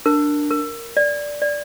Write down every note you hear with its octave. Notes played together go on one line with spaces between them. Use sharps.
D4 A#4
A#4
D5
D5